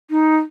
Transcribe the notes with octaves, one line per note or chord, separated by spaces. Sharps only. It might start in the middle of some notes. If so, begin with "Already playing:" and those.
D#4